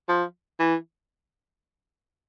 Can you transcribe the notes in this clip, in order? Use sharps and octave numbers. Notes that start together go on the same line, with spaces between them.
F3
E3